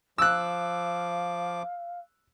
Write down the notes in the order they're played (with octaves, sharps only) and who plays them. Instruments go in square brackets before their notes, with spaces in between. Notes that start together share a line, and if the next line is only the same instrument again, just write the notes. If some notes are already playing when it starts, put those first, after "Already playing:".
[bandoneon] F3 D6 [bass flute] F5 [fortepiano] E6 F#6